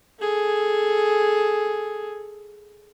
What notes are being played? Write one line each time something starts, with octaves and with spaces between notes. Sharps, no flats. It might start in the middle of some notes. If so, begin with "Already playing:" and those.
G#4 A4